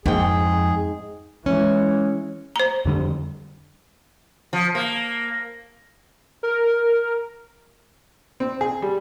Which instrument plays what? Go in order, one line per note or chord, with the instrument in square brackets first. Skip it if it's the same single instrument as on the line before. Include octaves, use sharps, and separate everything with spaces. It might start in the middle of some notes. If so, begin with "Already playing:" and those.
[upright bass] F2 [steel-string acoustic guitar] G#2 G5 [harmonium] G#4
[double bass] E3 G#3 [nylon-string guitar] C#4
[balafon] C5 A#5
[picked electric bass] F2 D3 G3
[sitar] F3
A#3
[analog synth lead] A#4
[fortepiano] C4
G#4
G3